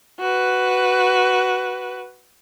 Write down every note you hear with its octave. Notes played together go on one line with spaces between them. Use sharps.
F#4 B4